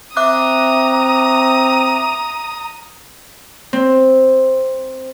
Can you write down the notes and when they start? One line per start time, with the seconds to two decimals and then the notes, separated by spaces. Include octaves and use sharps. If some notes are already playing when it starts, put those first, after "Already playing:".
0.17 C4 E5 A#5 D6 D#6 F#6
3.73 C4